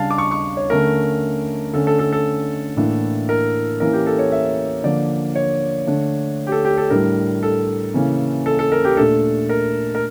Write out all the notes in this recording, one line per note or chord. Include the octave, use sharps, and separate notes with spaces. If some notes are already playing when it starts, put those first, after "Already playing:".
Already playing: C#3 G3 D4 F5 A5
D6
C#6
C#6
C#5
D3 A3 C#4 A#4
D3 A3 C#4 A4
A4
A4
A4
A2 E3 A#3 D4
A#4
E3 A#3 C#4 A#4
G4
A4
C#5
E5
D3 F3 A#3 D5
C#5
D3 A3 D4
G4
A4
G4
A4
A2 G3 D4 A#4
A4
C#3 E3 A#3 C#4
A4
A4
A#4
G4
A#2 A3 D4 A4
A#4
A#4